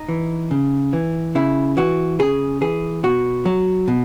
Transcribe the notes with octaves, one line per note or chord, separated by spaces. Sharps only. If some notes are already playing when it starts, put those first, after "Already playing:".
Already playing: D#4
E3
C#3
E3
C#3 E4
E3 F#4
C#3 G#4
E3 G#4
B2 F#4
F#3
B2